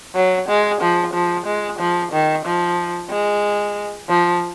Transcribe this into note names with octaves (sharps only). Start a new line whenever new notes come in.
F#3
G#3
F3
F3
G#3
F3
D#3
F3
G#3
F3